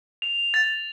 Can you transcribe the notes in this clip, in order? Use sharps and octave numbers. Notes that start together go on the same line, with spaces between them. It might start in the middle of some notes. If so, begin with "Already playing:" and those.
F7
A6